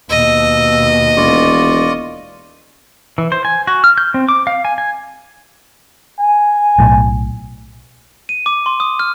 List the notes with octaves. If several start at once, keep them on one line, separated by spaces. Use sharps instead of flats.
D#2 B2 D#5 E6
E1 F4 D5 C#6
E3
C5
G#5
F#4
F6
G6
C4
D6
F5
G#5
G#5
G#5
B1 A2
D#7
D6
C6
D#6
F6